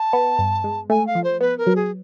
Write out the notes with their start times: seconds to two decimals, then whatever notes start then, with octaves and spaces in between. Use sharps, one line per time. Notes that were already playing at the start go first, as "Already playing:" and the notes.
Already playing: A5
0.13 B3
0.39 G2
0.64 G#3
0.90 A3 G#5
1.07 F5
1.15 F3
1.24 C5
1.41 B3 B4
1.58 A#4
1.67 F#3
1.76 G#4